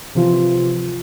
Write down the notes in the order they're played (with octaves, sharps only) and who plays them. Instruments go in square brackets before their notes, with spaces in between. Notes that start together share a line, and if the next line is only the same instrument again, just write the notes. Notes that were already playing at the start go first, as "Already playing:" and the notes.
[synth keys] C3 E3 F3 F4